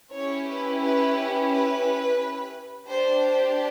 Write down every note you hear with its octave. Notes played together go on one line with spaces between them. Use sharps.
C#4 E4 G4 C#5
B4
B4
B4
D4 G4 C5